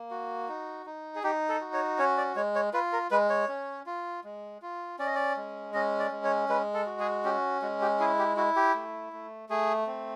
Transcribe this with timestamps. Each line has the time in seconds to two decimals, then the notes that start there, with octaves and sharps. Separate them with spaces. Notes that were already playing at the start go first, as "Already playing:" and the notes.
Already playing: A#3
0.11 F#4
0.48 D#4
0.86 D#4
1.15 G#4
1.23 D#4 G4
1.49 A4
1.61 F#4
1.73 C#5
1.99 C#4 C#5
2.17 D5
2.36 G#3 C#5
2.55 C#5
2.74 F4 B4
2.93 A#4
3.11 G#3 B4
3.30 C#5
3.49 C#4
3.86 F4
4.24 G#3
4.62 F4
4.99 C#4 D5
5.07 D#5
5.15 D5
5.37 G#3
5.74 C#4 D#5
6.00 D5
6.12 G#3
6.24 C#5
6.49 G#3 B4
6.74 A4
6.87 F#4
7.00 G#4
7.24 C#4 G4
7.62 G#3 F#4
7.81 G4
8.00 E4 G#4
8.19 G4
8.37 E4 F#4
8.56 G4
8.75 A3
9.13 A3
9.49 A3 G#4
9.87 C4